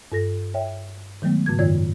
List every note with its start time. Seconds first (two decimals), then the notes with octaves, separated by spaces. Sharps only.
0.12 G2 A4 A#6
0.54 C#5 E5 G5
1.22 D#3 F#3 G#3 A3 B3
1.46 G#2 C#3 G#6
1.59 F#2 D#3 F4 C#5 D5 G#6